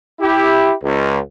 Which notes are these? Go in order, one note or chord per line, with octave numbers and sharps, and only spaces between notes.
E4 G4
C#2